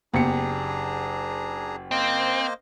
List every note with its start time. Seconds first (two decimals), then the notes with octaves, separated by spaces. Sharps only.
0.14 F#1 A#3 B3 D4 G4 G#4 A#5 C#7
1.91 A#3 C4 C5 D#5